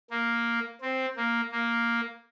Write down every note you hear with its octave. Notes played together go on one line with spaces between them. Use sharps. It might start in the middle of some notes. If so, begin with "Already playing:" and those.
A#3
C4
A#3
A#3